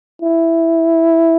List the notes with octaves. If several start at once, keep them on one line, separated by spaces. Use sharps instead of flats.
E4